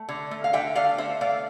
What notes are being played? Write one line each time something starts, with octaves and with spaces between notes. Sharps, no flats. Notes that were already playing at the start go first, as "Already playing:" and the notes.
Already playing: A3
D3
A3
F5
D3 E5 G5
A3 D5 F5
D3 C5 E5
A3 D5 F5